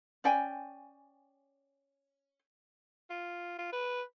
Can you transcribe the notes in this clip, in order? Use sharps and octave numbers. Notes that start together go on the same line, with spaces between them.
C#4 D5 G5 G#5
F4
F4
B4